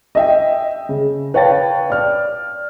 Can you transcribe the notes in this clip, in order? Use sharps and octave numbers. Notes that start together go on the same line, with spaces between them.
D#5 E5 G5
C#3
B4 C#5 F5 G5 A5 A6
D5 F6